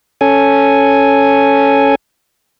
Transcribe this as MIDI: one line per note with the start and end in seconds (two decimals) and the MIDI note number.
0.21 1.95 61
0.21 1.95 69
0.21 1.95 80